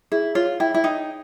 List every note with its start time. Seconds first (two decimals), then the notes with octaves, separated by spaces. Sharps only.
0.12 E4 G#4
0.35 F4 C#5
0.60 E4 G5
0.74 E4
0.84 D#4 G5